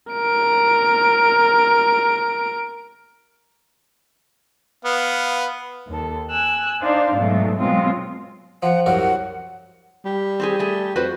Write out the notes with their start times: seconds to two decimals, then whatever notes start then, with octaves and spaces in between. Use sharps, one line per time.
0.12 A#4 D7
4.85 B3 F5
5.88 D#2 A4
6.31 G#5 E6 F#6
6.82 D4 D#4 C5 D5 F5
7.15 G#2 B2 F#3 A3
7.60 B2 F#3 G#3 B3 C4 F4
8.63 F3 F#5
8.86 C2 F#2 A#4 F#5
10.05 G3
10.40 C4 G4 G#4
10.59 A3 G#4
10.96 F2 F#4 B4 C5